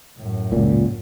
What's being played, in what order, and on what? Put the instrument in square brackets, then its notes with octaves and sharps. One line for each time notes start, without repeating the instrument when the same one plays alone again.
[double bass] F#2 A2
[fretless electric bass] C#2 A#2